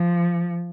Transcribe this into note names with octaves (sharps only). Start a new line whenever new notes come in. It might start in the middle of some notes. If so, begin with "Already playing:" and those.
Already playing: F3